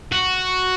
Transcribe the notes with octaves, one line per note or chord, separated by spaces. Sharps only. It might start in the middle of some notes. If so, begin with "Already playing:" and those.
F#4